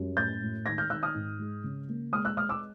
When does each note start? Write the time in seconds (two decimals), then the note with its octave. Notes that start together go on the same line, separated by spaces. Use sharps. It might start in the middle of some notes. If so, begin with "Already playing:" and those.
Already playing: F#2 G3
0.17 A2 G6 A6
0.41 A2
0.66 D#3 G#6 A#6
0.78 F6 G6
0.90 D#3 E6 F#6
1.03 D#6 F6
1.14 G#2
1.39 G#3
1.64 C#3
1.88 A#3
2.12 G#3 D#6 F6
2.25 E6 F#6
2.37 G#3 D#6 F6
2.49 D6 E6